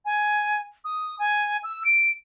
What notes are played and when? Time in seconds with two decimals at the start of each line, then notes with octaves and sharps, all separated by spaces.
0.05 G#5
0.84 D#6
1.19 G#5
1.63 E6
1.84 D7